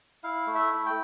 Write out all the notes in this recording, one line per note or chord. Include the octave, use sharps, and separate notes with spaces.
E4 F5
A3
E5
E4
G5